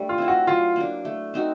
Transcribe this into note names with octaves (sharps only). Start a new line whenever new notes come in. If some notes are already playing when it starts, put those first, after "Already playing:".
Already playing: G3 A3 D4
F4
C4 E4
F#4
F#3 F4
A#3 D4
A3
C4 D#4 F#4